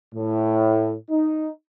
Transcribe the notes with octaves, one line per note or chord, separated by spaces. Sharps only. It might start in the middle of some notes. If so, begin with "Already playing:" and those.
A2
D#4